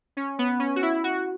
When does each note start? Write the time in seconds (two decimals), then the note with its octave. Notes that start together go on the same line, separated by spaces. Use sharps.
0.17 C#4
0.39 B3
0.60 C#4
0.76 F#4
0.82 E4
1.04 F#4